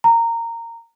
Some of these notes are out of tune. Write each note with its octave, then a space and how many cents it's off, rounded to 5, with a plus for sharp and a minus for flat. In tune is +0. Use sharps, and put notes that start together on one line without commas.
A#5 -15